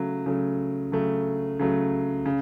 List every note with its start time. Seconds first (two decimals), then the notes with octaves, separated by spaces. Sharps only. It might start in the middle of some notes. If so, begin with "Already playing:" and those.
Already playing: C#3 F#3 A3
0.26 C#3 F#3 A3
0.92 C#3 F#3 A3
1.59 C#3 F#3 A3
2.26 C#3